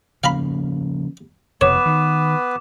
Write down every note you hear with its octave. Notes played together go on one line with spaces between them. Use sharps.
C#3 F3 A#3 F5 A#5 B5
F1 F2 B2 B3 B4 C#5 D6 E7
D#3